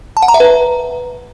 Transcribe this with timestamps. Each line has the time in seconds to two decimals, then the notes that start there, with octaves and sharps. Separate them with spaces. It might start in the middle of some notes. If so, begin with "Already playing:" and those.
0.17 A5
0.22 F#5
0.28 A#5
0.34 E5
0.40 B4